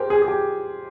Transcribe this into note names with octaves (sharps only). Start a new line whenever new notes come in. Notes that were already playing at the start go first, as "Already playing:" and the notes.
Already playing: G4 G#4 A#4 C5
G#4
G#4
G4